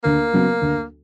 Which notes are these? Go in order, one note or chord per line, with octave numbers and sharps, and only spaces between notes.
D2 A#3
C#3 F#3 B3
D2